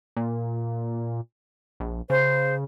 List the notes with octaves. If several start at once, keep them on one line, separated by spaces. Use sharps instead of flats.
A#2
A#1
C#3 C5